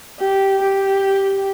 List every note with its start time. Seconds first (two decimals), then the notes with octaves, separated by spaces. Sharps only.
0.20 G4
0.62 G4